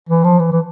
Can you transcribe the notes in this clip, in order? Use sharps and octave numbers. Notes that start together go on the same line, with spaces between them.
E3
F3
E3
E3